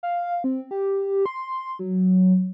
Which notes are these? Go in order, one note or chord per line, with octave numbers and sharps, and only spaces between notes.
F5
C4
G4
C6
F#3